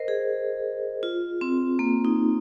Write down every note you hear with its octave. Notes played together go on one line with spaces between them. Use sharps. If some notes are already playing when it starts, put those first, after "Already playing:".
Already playing: A#4 C5 D#5
G#4
F4
C4
A#3
D#4